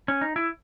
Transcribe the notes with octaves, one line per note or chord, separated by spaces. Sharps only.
C#4
D#4
E4